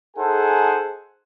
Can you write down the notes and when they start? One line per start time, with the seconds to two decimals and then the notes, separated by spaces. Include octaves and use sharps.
0.17 D#4 G#4 A4 C5 F#5 G#5